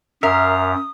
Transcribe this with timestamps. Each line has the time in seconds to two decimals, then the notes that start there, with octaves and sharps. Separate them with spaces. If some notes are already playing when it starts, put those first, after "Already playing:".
0.23 F#2 A#4 E5 F5 D#6